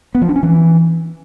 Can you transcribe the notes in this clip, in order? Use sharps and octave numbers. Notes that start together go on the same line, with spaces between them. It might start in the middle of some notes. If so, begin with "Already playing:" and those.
B3
F3
D4
C#4
E3